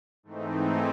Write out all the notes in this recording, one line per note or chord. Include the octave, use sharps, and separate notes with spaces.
G#2 E3 A3 C4 D#4